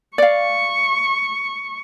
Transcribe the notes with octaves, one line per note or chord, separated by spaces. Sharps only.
D5 F5 C#6